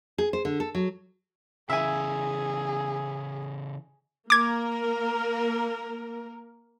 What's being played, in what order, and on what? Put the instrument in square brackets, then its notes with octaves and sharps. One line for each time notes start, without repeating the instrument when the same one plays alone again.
[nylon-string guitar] G#4
C5
D3
A4
F#3
[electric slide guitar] C#3 E3 [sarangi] G#4 [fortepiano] E5 G#5
[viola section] A#3 A#4 [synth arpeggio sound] D6 G#6